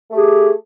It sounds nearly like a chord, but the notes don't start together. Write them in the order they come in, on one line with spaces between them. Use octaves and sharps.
A3 G4 G#4